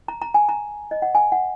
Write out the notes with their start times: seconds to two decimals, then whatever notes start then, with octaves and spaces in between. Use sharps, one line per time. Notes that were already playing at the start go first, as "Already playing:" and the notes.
0.08 A#5
0.22 A#5
0.34 G#5
0.49 A#5
0.91 D#5
1.02 F#5
1.15 G#5
1.32 F#5